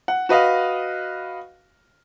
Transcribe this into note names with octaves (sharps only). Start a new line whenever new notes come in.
F#5
F#4 B4 D#5 F5